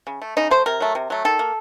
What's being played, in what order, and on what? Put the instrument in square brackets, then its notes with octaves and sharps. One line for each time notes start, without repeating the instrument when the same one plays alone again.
[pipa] C#3
A3
C#3 D#4
A3 C5
C3 A#4
F#3 A3
C3
F#3 A3
D#3 A4
A#3